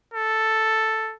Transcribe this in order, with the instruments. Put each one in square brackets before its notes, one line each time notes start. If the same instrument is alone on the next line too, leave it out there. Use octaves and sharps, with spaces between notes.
[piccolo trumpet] A4